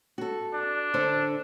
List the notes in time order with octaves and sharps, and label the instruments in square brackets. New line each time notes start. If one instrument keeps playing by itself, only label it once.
[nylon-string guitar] F#4 A4
[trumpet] D4
[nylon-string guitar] D3 A4 C5